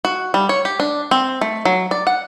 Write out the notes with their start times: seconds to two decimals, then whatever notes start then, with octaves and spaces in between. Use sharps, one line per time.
0.05 F#4
0.34 G3
0.49 C#5
0.65 G4
0.80 D4
1.11 C4
1.41 A3
1.65 F#3
1.91 D5
2.07 F#5